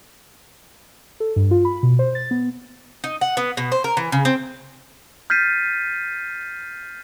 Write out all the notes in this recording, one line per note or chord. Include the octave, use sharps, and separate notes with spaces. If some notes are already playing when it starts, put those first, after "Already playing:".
A4
G2
F4
B5
B2
C5
A6
B3
D#4
F#5
B3
B2
C5
A#4
E3
C#3
C4
F6 G6 A6 B6 C7 D#7